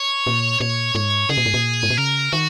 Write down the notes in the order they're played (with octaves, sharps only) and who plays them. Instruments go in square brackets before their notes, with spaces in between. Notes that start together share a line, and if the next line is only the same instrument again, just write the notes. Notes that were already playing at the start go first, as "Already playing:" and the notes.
Already playing: [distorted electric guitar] C#5
[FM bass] A#2
[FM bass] A#2 [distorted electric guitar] C#5
[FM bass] G#2 [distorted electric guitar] C#5
[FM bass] C#3 [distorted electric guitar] G#4
[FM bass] A#2
G#2
A#2
G#2
A#2
[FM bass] C#3 [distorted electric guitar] A#4
[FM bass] D#3 [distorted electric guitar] F#4